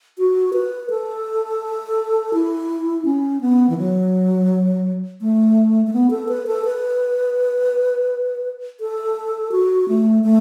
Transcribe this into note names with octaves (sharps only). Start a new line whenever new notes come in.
F#4
B4
A4
E4
C#4
B3
E3
F#3
A3
A3
B3
A4
B4
A4
B4
A4
F#4
A3
A3